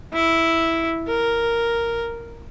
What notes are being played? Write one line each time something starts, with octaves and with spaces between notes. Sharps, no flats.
E4
A#4